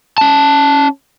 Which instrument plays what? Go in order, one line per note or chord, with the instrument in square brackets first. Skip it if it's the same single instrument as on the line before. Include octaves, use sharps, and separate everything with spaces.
[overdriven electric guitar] C#4 A5